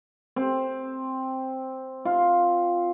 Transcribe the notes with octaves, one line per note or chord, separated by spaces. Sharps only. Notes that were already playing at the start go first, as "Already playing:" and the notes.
C4
F4